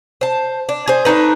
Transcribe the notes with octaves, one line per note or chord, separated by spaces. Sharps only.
C5 A5
D4
G#4 C5
A3 D4 D#4 B4